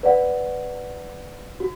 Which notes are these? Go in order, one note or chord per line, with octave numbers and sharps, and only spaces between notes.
B4 D5 F#5
F#4